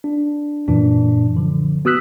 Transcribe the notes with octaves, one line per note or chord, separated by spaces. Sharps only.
D4
F#2 A#2 E3 D4
D3 F3
B3 F#4 D#6 E6 F#6 B6